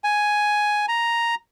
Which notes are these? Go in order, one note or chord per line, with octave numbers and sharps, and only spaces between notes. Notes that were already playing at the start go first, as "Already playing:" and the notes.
G#5
A#5